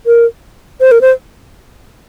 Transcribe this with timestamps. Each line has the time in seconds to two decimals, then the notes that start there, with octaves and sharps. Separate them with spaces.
0.06 A#4
0.81 C5
0.91 A#4
1.01 C5